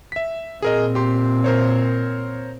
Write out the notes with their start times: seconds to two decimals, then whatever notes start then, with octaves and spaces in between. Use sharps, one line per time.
0.12 E5 B6
0.62 A#2 C4 G#4 A#4 D#5
0.95 G4 C6
1.44 A#4 C5 C#5